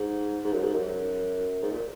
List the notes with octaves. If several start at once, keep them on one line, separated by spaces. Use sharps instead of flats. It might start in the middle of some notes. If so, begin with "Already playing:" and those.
Already playing: G#2
G#2
F#2
G#2
F#2
G#2
A#2